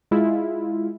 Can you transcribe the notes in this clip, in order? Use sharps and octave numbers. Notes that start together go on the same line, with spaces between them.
G#3 E4 F4